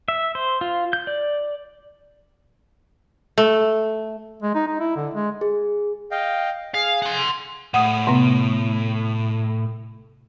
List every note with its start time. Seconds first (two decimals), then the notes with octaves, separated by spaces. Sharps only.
0.08 E5
0.35 C5
0.61 F4
0.93 G6
1.07 D5
3.38 A3
4.42 G#3
4.55 D#4
4.67 D#4
4.80 E4
4.96 D3
5.14 G#3
5.41 G#4
6.11 D#5 F5 G5
6.74 G#4 F5
7.02 F#5 C6
7.74 A2 F#5 D#6
8.07 C3 B3